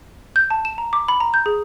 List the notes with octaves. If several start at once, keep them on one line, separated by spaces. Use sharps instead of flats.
G6
A5
E7
A#5
D6
B5
A#5
G6
G#4